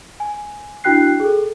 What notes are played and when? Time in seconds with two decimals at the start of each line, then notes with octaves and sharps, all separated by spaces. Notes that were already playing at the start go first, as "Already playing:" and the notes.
0.20 G#5
0.84 D4 E4 F#4 G5 F#6 C7
1.20 G#4 A4